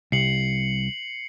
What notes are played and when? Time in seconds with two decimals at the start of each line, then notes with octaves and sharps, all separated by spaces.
0.12 C2 C7 C#7 F#7